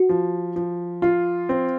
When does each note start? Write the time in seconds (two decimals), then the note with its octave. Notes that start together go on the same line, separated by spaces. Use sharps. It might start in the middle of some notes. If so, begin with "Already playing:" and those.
Already playing: F#4
0.09 F3
0.56 F3
1.02 F4
1.49 C4